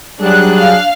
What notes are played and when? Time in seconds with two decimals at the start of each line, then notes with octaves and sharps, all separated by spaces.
0.21 F#3 G3 D4 G#4 F#6
0.58 F5